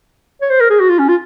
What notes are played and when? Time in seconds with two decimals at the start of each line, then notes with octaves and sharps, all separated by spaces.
0.41 C#5
0.50 C5
0.60 A#4
0.70 G#4
0.80 F#4
0.89 F4
0.99 C#4
1.09 F4